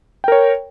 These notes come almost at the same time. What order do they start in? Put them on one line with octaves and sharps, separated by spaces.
G5 A#4 C#5